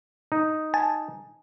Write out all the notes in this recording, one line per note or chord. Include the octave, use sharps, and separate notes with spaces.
D#4
G#5 A5